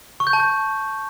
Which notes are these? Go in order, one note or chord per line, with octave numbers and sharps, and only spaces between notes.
C#6
G6
A5
G6